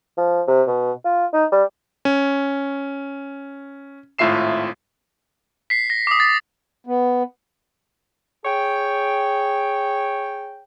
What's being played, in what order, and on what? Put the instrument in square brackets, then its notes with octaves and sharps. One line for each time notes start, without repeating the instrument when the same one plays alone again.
[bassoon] F3
C3
B2
F4
D#4
G3
[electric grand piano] C#4
G#1 A2 F4 E5 C7 E7
[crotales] B6 C7
A#6
D6 D#6
A6
[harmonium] B3
[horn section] G#4 C#5 G5